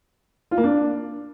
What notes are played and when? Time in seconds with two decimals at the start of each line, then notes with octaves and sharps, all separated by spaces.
0.51 F4
0.58 A#3
0.64 D4